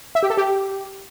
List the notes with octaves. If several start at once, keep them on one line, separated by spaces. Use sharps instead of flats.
E5
G4
A4
G4